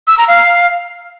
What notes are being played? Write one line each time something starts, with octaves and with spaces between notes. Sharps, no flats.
E6
A#5
F5